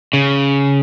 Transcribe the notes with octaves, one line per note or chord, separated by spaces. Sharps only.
C#3